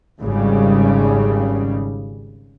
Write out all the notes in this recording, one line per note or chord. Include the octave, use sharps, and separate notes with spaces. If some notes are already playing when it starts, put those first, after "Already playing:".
G#1 C#3 G3